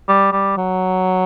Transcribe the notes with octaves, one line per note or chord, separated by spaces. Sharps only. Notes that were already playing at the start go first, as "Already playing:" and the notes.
G3
G3
F#3